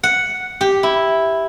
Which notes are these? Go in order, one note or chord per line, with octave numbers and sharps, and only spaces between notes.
F#5
G4
E4